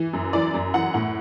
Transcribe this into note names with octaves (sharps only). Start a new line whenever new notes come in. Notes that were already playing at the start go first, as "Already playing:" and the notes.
Already playing: E3
F#2
E3 D5
F#2
E3 F#5
A2 F#5